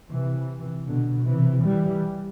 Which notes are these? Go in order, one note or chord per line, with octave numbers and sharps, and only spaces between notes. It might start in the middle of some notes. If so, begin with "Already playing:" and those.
C3 E3
B2 D3
C3 E3
E3 G3